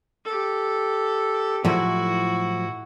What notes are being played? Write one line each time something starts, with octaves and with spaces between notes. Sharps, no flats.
G4 A4
A2 F3 F#3 E4 F#4